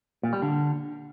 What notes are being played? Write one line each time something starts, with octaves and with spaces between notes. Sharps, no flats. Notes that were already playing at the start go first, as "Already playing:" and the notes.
A#2
G3
D3